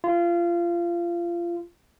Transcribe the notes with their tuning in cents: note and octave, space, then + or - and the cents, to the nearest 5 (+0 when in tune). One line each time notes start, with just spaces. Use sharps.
F4 -25